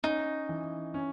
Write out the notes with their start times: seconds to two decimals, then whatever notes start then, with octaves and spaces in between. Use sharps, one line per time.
0.04 C#4 D#4
0.49 E3
0.94 C#4